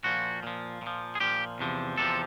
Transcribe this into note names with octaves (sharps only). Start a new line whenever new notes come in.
A#2 F3 F#4
A#2 F3
A#2 F3
G#4
A#2 F3 G4
E2 C3 F3
E2 C3 F3 A4